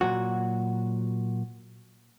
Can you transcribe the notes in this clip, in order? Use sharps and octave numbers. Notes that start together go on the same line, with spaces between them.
A#2 F#3 F#4